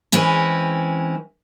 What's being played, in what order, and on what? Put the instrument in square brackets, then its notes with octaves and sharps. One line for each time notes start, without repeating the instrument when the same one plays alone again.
[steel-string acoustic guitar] E3 G#3 C4 C#4